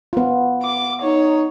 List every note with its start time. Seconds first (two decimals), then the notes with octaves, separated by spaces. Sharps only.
0.13 B3 F4
0.63 D6
1.02 D#4 C#5